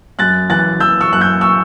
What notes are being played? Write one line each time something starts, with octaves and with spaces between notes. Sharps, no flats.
F#2 F#6 A6
E3 F#6 A6
E3 E6 G6
C#6 E6
F#2 F#6
E6 G6
C#6 E6